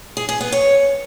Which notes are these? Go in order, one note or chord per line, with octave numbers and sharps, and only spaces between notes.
G#4
G#4
B3
C#5